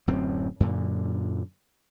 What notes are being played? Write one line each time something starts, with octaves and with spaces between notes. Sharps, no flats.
D1 F#2 A2 C4
F#2 A#2 D3